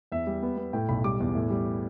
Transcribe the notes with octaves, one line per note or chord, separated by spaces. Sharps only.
E2 E5
G3
B3
B3
A2 G5
B1 B5
G3 D6
E2
A2
G3